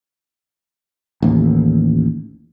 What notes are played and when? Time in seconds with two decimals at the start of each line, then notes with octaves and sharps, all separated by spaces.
1.22 A1 D#2